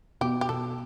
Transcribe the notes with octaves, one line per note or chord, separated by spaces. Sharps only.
B2 G4
G4
B2 A4